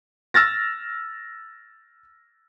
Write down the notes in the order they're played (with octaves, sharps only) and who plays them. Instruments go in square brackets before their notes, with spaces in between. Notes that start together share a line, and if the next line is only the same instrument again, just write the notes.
[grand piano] E6 F6 A6 A#6